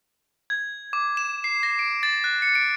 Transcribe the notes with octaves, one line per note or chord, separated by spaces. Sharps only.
G#6
D6
E7
C7
A#6
D7
A6
F#6
C#7
D7